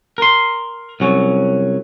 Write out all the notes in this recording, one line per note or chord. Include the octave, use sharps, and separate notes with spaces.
A#4 C6
C2 F#3 C#4